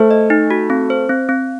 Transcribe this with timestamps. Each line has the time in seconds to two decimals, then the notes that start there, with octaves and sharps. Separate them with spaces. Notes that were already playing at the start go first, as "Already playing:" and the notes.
Already playing: A3 C5
0.11 D#5
0.30 D#4
0.50 F#4
0.70 C4
0.90 C5
1.09 C4
1.29 C4